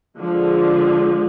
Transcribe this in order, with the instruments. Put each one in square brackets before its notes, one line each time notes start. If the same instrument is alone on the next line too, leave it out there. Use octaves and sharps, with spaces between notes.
[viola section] D3 F3 G#3